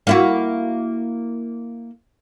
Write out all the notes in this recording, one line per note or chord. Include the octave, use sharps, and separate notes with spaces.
A#3 E4 F#4